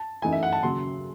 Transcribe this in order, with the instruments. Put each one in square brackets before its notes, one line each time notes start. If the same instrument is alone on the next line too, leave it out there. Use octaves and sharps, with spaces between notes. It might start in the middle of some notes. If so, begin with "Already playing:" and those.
Already playing: [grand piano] A5
[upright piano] F#2 E3 A3 D#4 [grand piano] G#5
[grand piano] E5
F#5
A5
[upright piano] D#2 C#3 F#3 [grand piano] C6